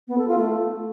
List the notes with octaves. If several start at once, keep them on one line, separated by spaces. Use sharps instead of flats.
B3
A4
F4
A3